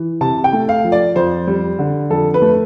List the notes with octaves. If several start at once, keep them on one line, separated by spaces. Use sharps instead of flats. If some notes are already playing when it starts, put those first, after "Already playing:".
Already playing: E3
C3 A5
G5
A3
F5
F3
D5
F2 C5
G3
D3
F2 A4
B4
A3